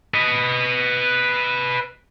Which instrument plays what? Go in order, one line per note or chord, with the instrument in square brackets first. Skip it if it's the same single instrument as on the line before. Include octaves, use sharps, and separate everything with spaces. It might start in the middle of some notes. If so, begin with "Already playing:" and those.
[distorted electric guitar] B4 D#5